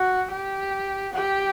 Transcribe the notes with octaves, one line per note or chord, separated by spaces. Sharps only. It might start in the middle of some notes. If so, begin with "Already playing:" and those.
Already playing: F#4
G4
G4